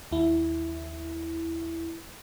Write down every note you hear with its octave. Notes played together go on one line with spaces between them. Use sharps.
D#2 E4